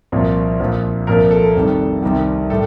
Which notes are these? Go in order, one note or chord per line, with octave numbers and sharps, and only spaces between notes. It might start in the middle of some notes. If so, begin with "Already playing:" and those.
C2 A#2 F3
A#1 A#2 F3
C2 A#2 F3 A#4
A4
F1 F2 D#3 G3
C2 C3 D#3 G3
A2 G3 A4